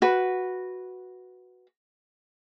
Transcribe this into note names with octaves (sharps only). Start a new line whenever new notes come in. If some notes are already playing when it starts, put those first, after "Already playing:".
F#4 B4